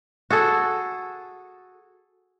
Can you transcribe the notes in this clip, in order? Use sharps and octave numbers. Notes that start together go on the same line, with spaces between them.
F#4 G#4 A4